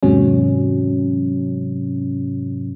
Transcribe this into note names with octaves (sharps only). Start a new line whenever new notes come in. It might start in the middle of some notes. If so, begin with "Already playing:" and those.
E2 G#2 C3 F#3 C#4